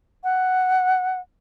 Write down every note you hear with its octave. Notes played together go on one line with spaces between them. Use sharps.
F#5